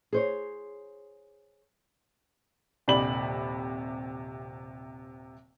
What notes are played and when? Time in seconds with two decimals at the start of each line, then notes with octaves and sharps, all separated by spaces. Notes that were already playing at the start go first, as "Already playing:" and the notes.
0.13 G#4 C5 C#5
2.88 D#1 C3 D5 B5 F#7